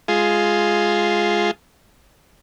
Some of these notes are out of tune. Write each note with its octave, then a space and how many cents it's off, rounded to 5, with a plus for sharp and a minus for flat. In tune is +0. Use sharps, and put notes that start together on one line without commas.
G#3 +5 F4 +0 G#4 +5